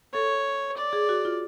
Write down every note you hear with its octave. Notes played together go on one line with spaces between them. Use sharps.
A4 C#5
D5
G#4
F#4
F4